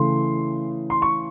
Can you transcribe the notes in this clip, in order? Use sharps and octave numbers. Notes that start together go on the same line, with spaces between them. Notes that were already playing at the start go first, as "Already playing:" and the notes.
Already playing: C#3 E3 A3 C6
C6
C#6